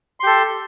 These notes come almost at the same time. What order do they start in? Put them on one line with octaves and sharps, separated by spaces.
C6 G4 A4